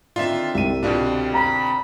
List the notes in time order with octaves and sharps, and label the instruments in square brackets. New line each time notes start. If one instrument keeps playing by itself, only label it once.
[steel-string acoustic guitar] D3 D#3 C4 [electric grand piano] F4 E5
[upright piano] C2 [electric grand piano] E5 D#7
[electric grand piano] B2 G3 D4 [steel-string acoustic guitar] D3 C4 F4
[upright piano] A#5 [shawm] B5